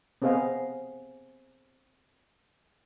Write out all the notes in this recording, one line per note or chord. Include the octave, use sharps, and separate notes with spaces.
B3 C4 G#4 D#5 F5